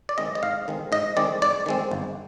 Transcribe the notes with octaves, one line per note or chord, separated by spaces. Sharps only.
D5
D#3 G#3 C4 D#5
D#5
G#2 F5
D#3 G#3 C4
G#2 D#5
D#3 G#3 C4 D5
G#2 D5
D#3 G#3 C4
G1